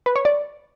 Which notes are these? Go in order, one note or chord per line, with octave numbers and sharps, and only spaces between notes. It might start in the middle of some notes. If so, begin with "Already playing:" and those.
B4
C#5
D5